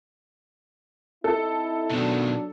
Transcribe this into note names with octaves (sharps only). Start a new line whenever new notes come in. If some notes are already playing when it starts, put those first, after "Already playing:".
C4 D#4 E4 A4
B2 D#3 F#3 D4